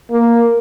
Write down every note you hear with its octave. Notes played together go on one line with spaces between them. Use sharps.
A#3